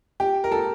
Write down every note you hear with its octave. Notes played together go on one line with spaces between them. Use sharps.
G4
A#4
A4